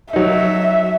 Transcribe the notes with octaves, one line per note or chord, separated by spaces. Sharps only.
F#3 D#4 E5